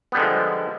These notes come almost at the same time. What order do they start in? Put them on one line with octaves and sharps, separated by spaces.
B3 G3 D3 G#3 F3